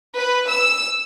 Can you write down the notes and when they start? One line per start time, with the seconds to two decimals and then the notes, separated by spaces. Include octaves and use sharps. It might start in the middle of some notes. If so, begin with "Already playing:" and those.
0.15 B4
0.49 E6